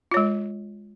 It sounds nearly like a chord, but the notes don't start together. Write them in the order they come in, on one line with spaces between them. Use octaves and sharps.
F4 C#5 G#3